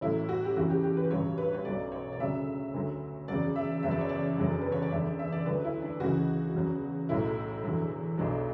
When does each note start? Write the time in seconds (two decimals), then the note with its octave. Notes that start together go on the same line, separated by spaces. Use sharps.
0.01 A1 A2 F#3 E4
0.29 F#4
0.45 G4
0.56 E2 C#3 E3 F#4
0.70 G4
0.83 G4
0.97 B4
1.11 A1 G2 F#3 C#5
1.38 B4
1.54 C#5
1.65 B1 B2 F#3 D5
1.92 C#5
2.13 D5
2.20 D2 C#3 F#3 E5
2.74 D2 D3 F#3
3.28 E2 C#3 F#3 D5
3.56 E5
3.83 F#1 E2 C#3 F#3 E5
3.91 D5
4.01 C#5
4.09 D5
4.38 F#1 E2 D3 F#3
4.61 B4
4.72 C#5
4.82 D5
4.92 F#1 E2 D3 E5
5.06 D5
5.19 E5
5.32 D5
5.46 D2 D3 F#3 B4
5.64 E4
5.82 D4
6.00 C#2 C#3 E3 F#4
6.55 E2 C#3 F#3
7.09 B1 A2 F#3 E4
7.64 E2 D3 F#3
8.18 B1 B2 F#3 D4